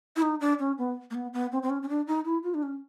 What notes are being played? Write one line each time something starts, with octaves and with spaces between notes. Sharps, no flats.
E4
D#4
D4
C#4
B3
A#3
B3
B3
C4
C4
C#4
C#4
D4
D#4
E4
F4
D4
C#4